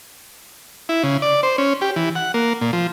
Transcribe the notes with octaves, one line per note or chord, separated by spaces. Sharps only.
E4
C#3
D5
C5
C#4
G4
E3
F#5
A#3
A#2
F3